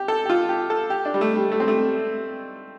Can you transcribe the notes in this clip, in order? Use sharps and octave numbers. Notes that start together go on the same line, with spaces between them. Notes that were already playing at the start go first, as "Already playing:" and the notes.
Already playing: G4
A4
G4
F4
G4
A4
G4
D4
G3
A3
G3
A3
C4
A3